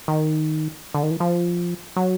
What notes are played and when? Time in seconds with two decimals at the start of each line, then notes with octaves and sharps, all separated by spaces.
0.08 D#3
0.94 D3
1.03 D#3
1.11 E3
1.20 F3
1.96 F#3